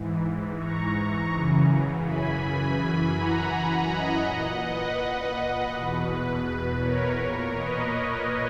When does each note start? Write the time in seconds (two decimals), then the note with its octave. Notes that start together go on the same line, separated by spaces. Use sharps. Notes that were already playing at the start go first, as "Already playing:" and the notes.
Already playing: G#2 E3
0.58 A#5 C#6
1.31 F#2 C#3 E3
2.04 G#5 B5
2.78 F#2 E3
3.14 F#5 A#5
3.87 D#5 F#5
4.24 A#2
4.61 B4 D#5
5.34 B4
5.71 E2 B2
6.08 B4
6.80 A#4 C#5
7.18 A#2
7.54 B4 D#5